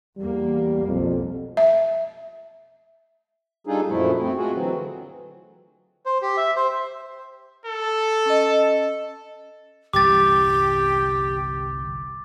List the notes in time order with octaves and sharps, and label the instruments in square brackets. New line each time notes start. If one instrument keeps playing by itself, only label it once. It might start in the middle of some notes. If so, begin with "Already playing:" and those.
[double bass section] E2 A#3 [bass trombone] G3
[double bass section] B1 [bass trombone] F2
[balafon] E5
[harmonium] G3 D4 D#4 F4 G#4 A4
F#2 A#2 F3 A3 E4
A3 C4
G#3 A3 F4 F#4 G#4
D3 E3 F#3 C4
[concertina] C5
G4
E5
C5
[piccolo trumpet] A4
[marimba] C#4 D#5
[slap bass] G1 C2 E3 [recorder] G4 [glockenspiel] D6 A6